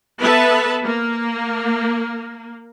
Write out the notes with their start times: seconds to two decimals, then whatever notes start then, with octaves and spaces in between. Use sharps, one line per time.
0.20 B3 A4 B4 E5 A5
0.85 A#3